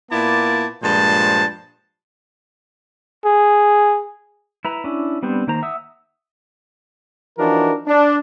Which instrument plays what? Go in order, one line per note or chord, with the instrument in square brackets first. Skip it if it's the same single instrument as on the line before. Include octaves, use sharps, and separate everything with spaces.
[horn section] A#2 A#3 B3 E4 D5 A5
G2 A#2 F3 G#3 C5 A5
[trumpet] G#4
[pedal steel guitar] E4 B4 A#5
C#4 D4 E4
G3 B3 C4 D4 C5
D#3 A#3 C5 A#5
E5 F#5 D#6 E6
[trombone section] E3 F3 D4 D#4 F#4 A#4
D4